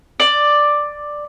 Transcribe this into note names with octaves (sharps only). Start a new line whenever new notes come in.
D5